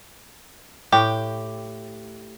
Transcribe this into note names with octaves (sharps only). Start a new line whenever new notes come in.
A2 G4 G5